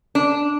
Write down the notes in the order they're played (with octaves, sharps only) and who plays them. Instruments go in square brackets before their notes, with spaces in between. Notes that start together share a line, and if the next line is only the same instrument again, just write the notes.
[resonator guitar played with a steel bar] D4